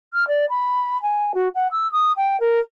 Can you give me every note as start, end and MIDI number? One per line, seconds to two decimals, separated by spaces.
0.13 0.27 89
0.27 0.45 74
0.50 1.00 83
1.02 1.32 80
1.34 1.48 66
1.55 1.67 78
1.71 1.90 88
1.92 2.12 87
2.17 2.39 79
2.40 2.59 70